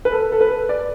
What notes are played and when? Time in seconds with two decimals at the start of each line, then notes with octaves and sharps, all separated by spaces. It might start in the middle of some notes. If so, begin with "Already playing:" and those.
0.05 B4
0.12 A4
0.32 A4
0.41 B4
0.69 D5